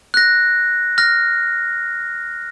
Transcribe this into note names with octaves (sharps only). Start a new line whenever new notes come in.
F#6 A#6
F6 A#6